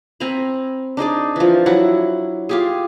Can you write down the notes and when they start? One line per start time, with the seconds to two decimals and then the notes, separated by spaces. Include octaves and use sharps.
0.20 C4 G#5 A#5 B5
0.97 D4 D#4 G#4 D5
1.36 E3 F3
1.66 F#3 E4 F#5
2.49 F4 G4 G#4